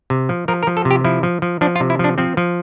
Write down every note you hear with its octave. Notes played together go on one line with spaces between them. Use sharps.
C3
F3
F3 A#4
A#4
F3
A4
C3
G4
F3 E4
F3
F3
F3 D4
F4
C3
E4
F3 D4
F3 C4
F3